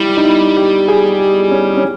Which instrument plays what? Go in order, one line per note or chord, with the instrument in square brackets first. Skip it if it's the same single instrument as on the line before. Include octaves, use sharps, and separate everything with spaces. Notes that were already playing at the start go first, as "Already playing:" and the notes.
Already playing: [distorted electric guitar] G3 [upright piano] E4
[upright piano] D#4
E4
G4
G#4
G4
C#4
C#4